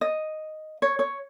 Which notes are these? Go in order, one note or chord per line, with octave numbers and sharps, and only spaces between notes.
D#5
C#5
C#5